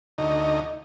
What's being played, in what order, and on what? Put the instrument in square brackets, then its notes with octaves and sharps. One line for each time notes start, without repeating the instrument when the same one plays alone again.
[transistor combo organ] D2 D#4